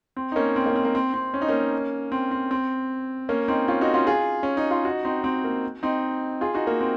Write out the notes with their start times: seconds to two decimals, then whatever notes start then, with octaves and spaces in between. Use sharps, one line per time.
0.17 C4
0.32 D#4
0.36 A#3 C#4
0.56 C4
0.66 A#3
0.70 C#4
0.76 C4
0.85 A#3
0.95 C4
1.14 C4
1.34 C#4
1.42 D#4
1.49 A#3 C#4
2.12 C4
2.31 C4
2.51 C4
3.29 A#3 C#4
3.48 C4 D#4
3.68 C#4 F4
3.81 D#4 F#4
3.94 C#4 F4
4.07 F4 G#4
4.43 C#4
4.57 D#4
4.71 F4
4.85 D#4 F#4
5.05 C4 D#4
5.24 C4
5.44 A#3
5.83 C4 D#4
6.41 F4 G#4
6.55 D#4 F#4
6.67 A#3
6.81 C4